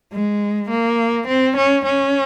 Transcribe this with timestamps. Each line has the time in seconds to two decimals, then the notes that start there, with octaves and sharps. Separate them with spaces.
0.13 G#3
0.70 A#3
1.28 C4
1.57 C#4
1.86 C#4